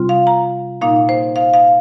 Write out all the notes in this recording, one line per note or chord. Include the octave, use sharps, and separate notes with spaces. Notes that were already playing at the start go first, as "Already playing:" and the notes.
Already playing: C3 G3 C4 F4
F5
A#5
A#2 A#3 D#4 F5
C5
F5
F5